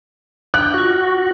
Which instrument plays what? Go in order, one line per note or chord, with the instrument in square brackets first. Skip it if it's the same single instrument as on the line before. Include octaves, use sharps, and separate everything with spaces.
[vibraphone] D4 [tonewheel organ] G5 [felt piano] F#6
[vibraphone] F4 C#6 [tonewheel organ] F#4